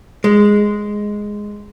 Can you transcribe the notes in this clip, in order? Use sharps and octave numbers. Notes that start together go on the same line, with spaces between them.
G#3